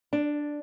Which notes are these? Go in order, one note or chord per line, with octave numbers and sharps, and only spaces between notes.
D4